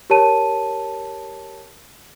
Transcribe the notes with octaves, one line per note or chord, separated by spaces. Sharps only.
G4 A#4 C#5 A5 D#7